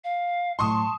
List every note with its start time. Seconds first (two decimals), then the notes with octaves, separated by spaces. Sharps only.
0.04 F5
0.59 A2 F#3 A5 C6 C#6 D#6